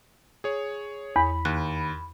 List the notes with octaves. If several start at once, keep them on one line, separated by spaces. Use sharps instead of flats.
G#4 C#5
E2 B5
D#2 F#6